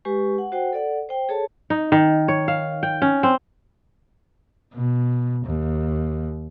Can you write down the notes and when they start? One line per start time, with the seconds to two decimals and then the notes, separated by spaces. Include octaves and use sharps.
0.05 G#3 G4 B4 G#5 C#6
0.38 F#5
0.52 F#4 C5 F#5 G5
0.73 A4 D5 F#5
1.09 C5 G5
1.29 G#4 A4 C#5 A5
1.70 D#4
1.92 D#3
2.28 C#5
2.48 F5
2.83 G5
3.02 C#4
3.23 C4
4.74 B2
5.45 D#2